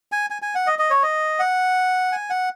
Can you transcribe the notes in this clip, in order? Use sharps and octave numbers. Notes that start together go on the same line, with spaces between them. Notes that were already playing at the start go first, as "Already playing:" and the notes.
G#5
G#5
G#5
F#5
D#5
D#5
C#5
D#5
F#5
G#5
F#5